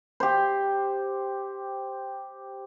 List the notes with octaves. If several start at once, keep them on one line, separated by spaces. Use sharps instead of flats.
G4 C5